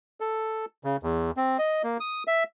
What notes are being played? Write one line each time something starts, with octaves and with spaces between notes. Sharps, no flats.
A4
C#3
E2
C4
D#5
A#3
D#6
E5